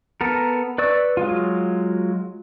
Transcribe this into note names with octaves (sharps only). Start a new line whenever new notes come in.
B3 A4 A#4
B4 D5 C#6 E6
F#3 G#3 F4